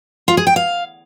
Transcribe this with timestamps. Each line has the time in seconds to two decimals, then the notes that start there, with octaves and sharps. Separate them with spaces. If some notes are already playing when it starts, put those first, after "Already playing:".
0.28 F4
0.37 G#4
0.47 G5
0.56 F5